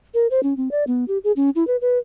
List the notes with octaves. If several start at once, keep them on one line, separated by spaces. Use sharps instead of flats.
A#4
C5
C#4
C4
D5
B3
G4
G#4
C#4
E4
B4
B4